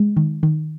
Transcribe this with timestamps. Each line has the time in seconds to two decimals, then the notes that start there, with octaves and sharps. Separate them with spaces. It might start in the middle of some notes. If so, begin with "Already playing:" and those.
Already playing: G#3
0.17 D#3
0.43 D#3